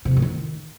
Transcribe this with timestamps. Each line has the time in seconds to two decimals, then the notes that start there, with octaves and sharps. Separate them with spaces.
0.05 C3
0.11 F2
0.17 A2
0.22 D#3